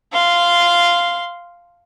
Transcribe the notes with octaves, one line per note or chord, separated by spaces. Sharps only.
F5 C6